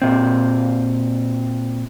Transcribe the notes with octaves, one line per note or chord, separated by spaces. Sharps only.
A#2 C4